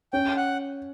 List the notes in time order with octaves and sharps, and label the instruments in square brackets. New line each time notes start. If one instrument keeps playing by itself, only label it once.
[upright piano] C#4 [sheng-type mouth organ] G5
[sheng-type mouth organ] F#5